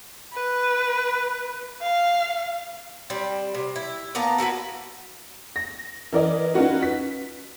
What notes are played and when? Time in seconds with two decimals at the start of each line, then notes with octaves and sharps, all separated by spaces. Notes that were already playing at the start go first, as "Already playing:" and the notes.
0.33 B4
1.81 F5
3.10 G3 C4
3.54 C3
3.76 E4
4.15 A#3 B3 A5 A#5
4.38 E4 F#4 A4 B4
5.56 A#6
6.13 E3 A#4 D5 D#5
6.54 C#4 D#4 F4 F#4 B4
6.82 B6